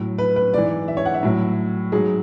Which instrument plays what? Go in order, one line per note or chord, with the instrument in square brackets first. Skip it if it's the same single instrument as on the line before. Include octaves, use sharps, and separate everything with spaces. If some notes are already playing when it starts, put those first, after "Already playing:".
Already playing: [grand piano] A2 F#3
B4
B4
G#2 E3 D5
E5
C#5
F#5
E5
A2 F#3
G#2 F#3 G#4